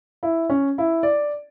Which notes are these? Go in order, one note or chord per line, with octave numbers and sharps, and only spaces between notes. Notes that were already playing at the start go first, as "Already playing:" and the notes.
E4
C#4
E4
D5